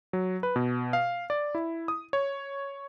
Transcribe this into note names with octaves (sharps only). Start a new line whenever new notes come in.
F#3
B4
B2
F5
D5
E4
D#6
C#5